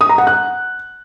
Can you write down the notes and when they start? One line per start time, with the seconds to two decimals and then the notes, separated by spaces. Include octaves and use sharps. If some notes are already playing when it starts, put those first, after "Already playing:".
0.01 D#6
0.09 A#5
0.18 F#5
0.27 F#6